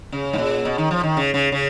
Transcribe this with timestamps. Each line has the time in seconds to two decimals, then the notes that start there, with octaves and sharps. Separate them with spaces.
0.12 C#3
0.33 G#2
0.38 A#2
0.65 B2
0.78 D#3
0.91 F3
1.03 D#3
1.17 C#3
1.34 C#3
1.52 C#3